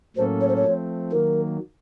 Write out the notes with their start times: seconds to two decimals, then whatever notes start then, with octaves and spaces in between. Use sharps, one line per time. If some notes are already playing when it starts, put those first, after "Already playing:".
0.17 A2 F#3 A#3 C#4 A4 C5
0.41 C#5
0.48 C5
0.56 C#5
0.65 F3 A3 C4
1.12 D#3 F#3 A#3 A#4